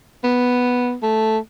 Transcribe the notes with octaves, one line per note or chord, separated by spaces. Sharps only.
B3
A3